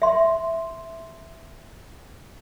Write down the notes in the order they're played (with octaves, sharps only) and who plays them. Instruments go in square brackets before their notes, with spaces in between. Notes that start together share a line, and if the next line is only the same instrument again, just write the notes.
[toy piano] E5 C6